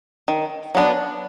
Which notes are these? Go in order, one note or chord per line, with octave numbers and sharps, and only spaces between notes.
D#3
F#3 B3 D4